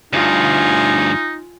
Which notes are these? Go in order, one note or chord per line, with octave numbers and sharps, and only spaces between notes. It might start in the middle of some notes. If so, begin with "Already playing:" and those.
D2 G2 D#4 F4 G#5